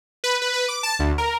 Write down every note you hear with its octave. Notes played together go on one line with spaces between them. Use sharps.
B4
B4
B4
D6
A5
D2
A#4